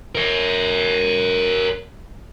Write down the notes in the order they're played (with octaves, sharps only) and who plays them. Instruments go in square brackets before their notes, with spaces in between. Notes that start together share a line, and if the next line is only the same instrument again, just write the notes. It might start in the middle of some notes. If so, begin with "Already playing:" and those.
[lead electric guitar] A#4 C#5